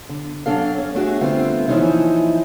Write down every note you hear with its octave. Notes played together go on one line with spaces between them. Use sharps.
D3
F#2 D4 A4 F5
C#4
A3 D4 F#4 G#4
D3 G3 A3 B3 C4 F4
A#2 E3 F3 C#4 D#4 E4